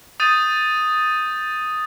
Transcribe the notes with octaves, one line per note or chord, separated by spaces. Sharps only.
D#6 G6 A6 D#7